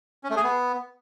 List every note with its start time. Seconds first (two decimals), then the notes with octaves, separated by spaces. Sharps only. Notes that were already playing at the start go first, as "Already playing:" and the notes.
0.24 C#4
0.30 A3
0.37 G#4
0.43 B3